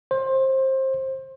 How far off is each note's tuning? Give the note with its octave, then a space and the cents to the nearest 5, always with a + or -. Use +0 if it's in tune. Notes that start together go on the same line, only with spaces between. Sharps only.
C5 +25